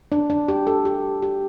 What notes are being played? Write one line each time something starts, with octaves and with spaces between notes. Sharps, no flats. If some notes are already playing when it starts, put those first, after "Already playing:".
D4
D4
G4
A4
G4
G4